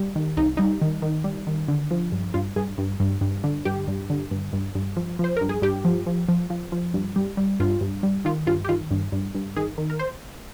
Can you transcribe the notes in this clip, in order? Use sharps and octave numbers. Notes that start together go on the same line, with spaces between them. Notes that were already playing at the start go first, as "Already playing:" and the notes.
Already playing: G3
D#3
C2 D#4
G3 D#4
D#3
D#3
G3
D#3
D3
F3
G2
G2 F4
G2 G#4
G2
G2
G2
D3
G2 G4
G2
D3
G2
G2
G2
F3
F3 C5
G2 A#4
G#4
G2 G4
F3
F3
F3
F3
F3
G2
G3
G3
G2 F4
G2
G3
D#3 F4
G2 F4
G4
D#3 F4
G2
G2
G2
D#3 G#4
D#3
A#4
C5